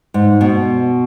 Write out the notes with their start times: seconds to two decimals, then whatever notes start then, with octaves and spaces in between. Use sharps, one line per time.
0.14 G#2
0.41 B2